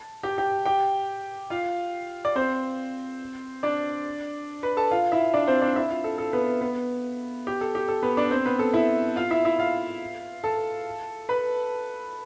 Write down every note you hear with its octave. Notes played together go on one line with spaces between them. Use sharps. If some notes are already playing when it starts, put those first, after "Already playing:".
Already playing: A5
G4 G5
G4 G5
G4 G5
F4 F5
D5
C4 C5
D4 D5
B4 B5
A4 A5
F4 F5
E4 E5
D4 D5
C4 C5
D4 D5
E4 E5
F4 F5
A4
A4
B3 B4
B3 B4
G4
A4
G4
A4
B3 B4
D4 D5
C4 C5
B3 B4
A4
E4 E5
F4 F5
E4 E5
E4 E5
F4 F5
A4 A5
B4 B5